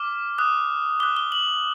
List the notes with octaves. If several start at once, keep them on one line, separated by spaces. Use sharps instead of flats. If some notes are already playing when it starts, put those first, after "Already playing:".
Already playing: D6 F6
D#6 F#6
D6 F#6 G7
G7
F#7